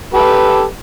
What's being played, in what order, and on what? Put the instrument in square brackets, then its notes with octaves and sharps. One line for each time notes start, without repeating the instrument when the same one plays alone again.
[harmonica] G4 A4 B4